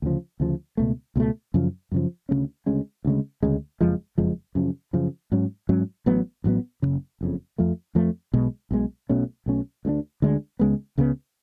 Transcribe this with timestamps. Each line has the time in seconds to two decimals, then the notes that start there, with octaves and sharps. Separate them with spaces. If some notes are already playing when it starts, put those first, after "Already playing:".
0.02 D2 C#3 F3
0.40 D2 C#3 F3
0.77 C#2 B2 A3
1.16 C#2 B2 A3
1.54 F#2 C#3 F3
1.92 F#2 C#3 F3
2.29 D2 C#3 G#3 C#4
2.66 D2 C#3 G#3 C#4
3.05 D2 C#3 G#3
3.43 D2 C#3 G#3
3.81 F#1 F2 F3 G#3
4.18 F#1 F2 F3 G#3
4.55 F#2 C#3 F3
4.93 F#2 C#3 F3
5.32 G#2 F#3 C#4
5.69 G#2 F#3 C#4
6.06 A1 A2 F#3 B3
6.44 A1 A2 F#3 B3
6.82 F#1 F2 C#3
7.21 F#1 F2 C#3
7.58 F2 F3 A3
7.95 F2 F3 A3
8.34 B1 B2 G#3
8.71 B1 B2 G#3
9.09 B1 B2 A3 C#4
9.46 B1 B2 A3 C#4
9.85 D2 D3 G#3 D4
10.22 D2 D3 G#3 D4
10.59 C#2 C#3 G#3 B3
10.98 C#2 C#3 G#3 B3